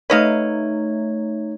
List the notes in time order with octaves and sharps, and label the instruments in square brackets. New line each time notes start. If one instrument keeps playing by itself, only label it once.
[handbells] A3 D#4 C#5 [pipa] B4 D#5 F5